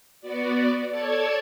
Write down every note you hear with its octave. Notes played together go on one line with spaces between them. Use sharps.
B3 F#4 D5
A4 C#5 D5 A5 G#6